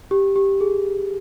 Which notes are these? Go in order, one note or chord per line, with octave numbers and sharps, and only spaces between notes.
G4
G4
G#4